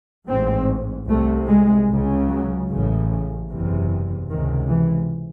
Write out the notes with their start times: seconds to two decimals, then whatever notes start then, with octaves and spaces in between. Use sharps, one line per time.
0.28 A1 G#2 C4
1.08 C2 C3 A3
1.49 G#3
1.89 C#2 C#3
2.28 F#3
2.70 A1 A2 C#3
3.49 F#1 E2 C3
4.29 C#2 C3 D#3
4.69 E3